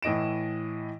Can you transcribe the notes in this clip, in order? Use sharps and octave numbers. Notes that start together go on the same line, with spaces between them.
A2 E3 D#5 D7 E7